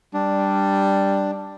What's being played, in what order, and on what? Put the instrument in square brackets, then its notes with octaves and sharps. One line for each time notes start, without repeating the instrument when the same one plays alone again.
[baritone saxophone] G3 [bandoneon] D4